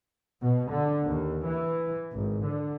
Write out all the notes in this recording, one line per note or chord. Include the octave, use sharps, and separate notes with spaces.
B2
D3
D#2
E3
G#1
D3